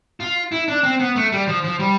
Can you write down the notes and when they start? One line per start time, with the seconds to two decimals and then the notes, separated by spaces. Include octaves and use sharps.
0.20 F4
0.52 E4
0.68 D4
0.83 C4
1.00 B3
1.16 A3
1.32 G3
1.47 F3
1.64 F3
1.79 G3